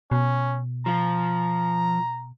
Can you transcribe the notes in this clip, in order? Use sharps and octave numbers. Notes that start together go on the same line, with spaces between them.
B2 C#4
F3 F4 A#5